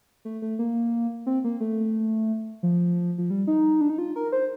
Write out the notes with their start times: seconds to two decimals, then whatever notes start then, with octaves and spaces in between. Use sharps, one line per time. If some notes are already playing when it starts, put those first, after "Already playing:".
0.25 A3
0.42 A3
0.59 A#3
1.26 C4
1.44 A#3
1.60 A3
2.63 F3
3.18 F3
3.30 G3
3.47 D#4
3.81 D4
3.90 D#4
3.98 F4
4.16 A#4
4.32 C5